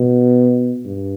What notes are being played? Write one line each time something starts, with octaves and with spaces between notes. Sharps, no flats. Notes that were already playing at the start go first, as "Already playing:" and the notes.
Already playing: B2
G2